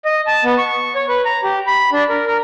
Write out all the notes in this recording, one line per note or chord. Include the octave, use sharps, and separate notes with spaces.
D#5
A5
B3
C#6
C#5
B4
A#5
G4
B5
D4
A#4
A#4